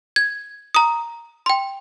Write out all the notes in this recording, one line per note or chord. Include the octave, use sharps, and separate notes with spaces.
G#6
A#5 D#6
G5 C6